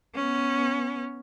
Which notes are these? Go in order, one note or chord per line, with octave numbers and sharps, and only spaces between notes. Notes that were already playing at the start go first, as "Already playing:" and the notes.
B3 C#4